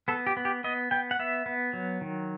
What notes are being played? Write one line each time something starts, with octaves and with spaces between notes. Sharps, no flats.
B3 A4
G4
B3
G4
B3 D#5
B3 G5
F#5
B3 E5
B3
F#3
D#3